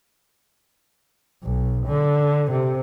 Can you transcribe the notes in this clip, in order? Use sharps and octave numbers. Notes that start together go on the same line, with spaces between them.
B1
D3
C3